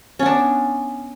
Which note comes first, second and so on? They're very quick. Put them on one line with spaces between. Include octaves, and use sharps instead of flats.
C#4 B3 D4